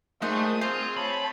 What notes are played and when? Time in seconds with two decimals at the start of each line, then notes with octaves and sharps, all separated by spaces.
0.22 A#2 A3 D#4 G#4 C5 F#5 D#6
0.61 C4 C5 F5 G#5 C6
0.96 C#5 A5 B5